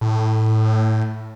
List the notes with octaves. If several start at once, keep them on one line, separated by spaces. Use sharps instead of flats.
A2